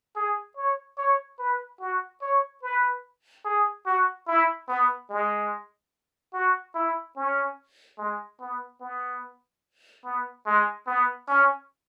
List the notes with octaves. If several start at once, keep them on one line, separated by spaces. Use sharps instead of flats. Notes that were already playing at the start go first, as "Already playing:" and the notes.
G#4
C#5
C#5
B4
F#4
C#5
B4
G#4
F#4
E4
B3
G#3
F#4
E4
C#4
G#3
B3
B3
B3
G#3
B3
C#4